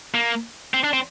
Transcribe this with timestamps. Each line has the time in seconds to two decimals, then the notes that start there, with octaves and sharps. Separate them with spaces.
0.14 A#3
0.74 C4
0.84 D4
0.93 C4